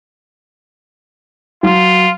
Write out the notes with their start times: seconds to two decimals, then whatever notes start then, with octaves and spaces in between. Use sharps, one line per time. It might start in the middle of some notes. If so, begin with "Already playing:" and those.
1.63 F#3 F4